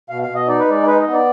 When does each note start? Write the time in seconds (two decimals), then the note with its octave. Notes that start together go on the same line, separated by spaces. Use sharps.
0.09 B2 F5
0.22 F5
0.28 B2
0.35 D#5
0.48 D#4 D5
0.59 B4
0.67 G#3 D5
0.87 D#4 B4
1.01 D#5
1.07 B3
1.13 D5